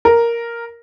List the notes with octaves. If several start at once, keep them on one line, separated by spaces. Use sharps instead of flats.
A#4